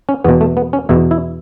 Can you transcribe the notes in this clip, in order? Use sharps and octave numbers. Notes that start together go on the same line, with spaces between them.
C#4
E2 B2 B3
A3
B3
C#4
E2 B2 E4
E4